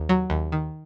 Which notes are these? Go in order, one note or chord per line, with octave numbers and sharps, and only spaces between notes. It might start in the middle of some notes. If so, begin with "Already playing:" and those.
Already playing: D#2
F#3
D#2
D#3